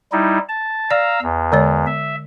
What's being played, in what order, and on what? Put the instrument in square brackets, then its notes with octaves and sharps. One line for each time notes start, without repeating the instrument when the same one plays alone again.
[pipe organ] G3 D#4 E4
A5
[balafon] D5 [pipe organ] F5 A#5 E6
[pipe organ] E2
[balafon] D3 G#3 C#5
[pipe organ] E5